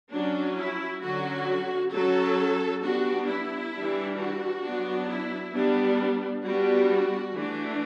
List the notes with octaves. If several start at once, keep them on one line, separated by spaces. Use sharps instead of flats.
F#3 C#4 D4
E4
D3 F#3 C#4 F#4
F#3 C#4 A4
G3 B3 D4 F#4
E4
E3 G3 D4
F#4
F#3 B3 D4
E4
G3 B3 D4
G3 B3 D4 F#4
E3 A3 D4